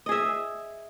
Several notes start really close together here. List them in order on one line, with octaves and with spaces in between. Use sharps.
D#5 G#4 E5